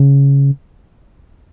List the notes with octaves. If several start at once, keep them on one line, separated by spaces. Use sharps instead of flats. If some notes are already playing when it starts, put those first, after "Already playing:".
Already playing: C#3